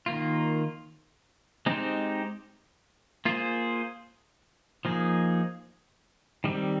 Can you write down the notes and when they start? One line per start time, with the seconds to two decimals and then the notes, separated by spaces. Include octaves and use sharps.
0.06 D#3 A#3 F4
1.66 G#3 C4 D#4 G4 C5
3.25 A#3 F4 G#4 C5
4.85 F3 A#3 D#4 G#4
6.44 D#3 G3 C4